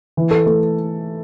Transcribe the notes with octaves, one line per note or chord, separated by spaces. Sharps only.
E3
A4
A3